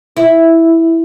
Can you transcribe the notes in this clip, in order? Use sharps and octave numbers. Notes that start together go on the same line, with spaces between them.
E4